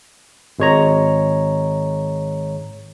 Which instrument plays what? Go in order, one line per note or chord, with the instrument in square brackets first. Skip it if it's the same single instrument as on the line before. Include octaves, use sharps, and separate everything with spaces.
[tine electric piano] G#1 G#3 C#5 A#5